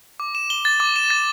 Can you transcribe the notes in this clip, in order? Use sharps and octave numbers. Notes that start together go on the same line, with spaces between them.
D6
E7
G7
A6
D6
E7
A6